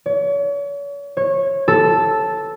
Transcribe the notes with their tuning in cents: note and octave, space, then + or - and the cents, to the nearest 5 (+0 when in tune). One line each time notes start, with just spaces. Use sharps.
C#5 +40
C#5 -20
A4 -5